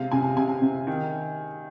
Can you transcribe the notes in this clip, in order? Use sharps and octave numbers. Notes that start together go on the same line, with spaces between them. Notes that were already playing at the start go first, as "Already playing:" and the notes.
Already playing: C3 G#3 F5
C3 G#5
C3 G#5
C3
D#3